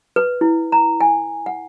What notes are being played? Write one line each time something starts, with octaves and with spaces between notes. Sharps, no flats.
B4
E4
A#5
G#5
F#5